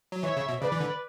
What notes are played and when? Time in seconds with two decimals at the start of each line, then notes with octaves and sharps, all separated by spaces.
0.12 F#3
0.23 E3 C#5 E5
0.37 C#3
0.49 B2
0.61 C#3 B4 D5
0.72 E3
0.80 D3